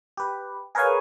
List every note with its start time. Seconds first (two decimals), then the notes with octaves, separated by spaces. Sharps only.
0.17 G4 B4
0.75 G#4 A#4 B4 C#5 F5 G#5